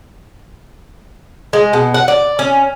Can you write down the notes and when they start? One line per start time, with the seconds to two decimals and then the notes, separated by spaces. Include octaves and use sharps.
1.53 G#3
1.73 B2
1.94 F#5
2.08 D5
2.39 C#4